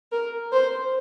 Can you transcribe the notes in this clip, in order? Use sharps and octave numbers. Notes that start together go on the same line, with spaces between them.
A#4
C5